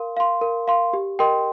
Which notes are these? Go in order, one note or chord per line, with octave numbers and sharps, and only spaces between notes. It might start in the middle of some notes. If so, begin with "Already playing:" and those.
Already playing: A#4 F5 C6
F5 C6
A#4
F5 C6
G4
A#4 D#5 G5 C6